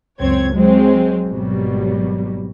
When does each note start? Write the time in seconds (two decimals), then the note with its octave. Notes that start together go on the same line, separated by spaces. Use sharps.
0.19 C#2 F#2 C4 C#5 G#6
0.52 F#3 G#3 C4
1.27 G#1 B2 F#3 G3